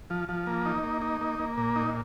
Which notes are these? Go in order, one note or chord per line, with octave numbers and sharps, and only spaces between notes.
F3
F3
A#3
D#4
A#3
D#4
A#3
A#3
A#2
D#4